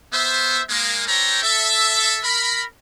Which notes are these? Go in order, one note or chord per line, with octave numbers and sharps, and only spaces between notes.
B3 C5 E5
G#3 A#3
D4 A4 C5 C#5 G5 A#5
A4 E5
A#4 B5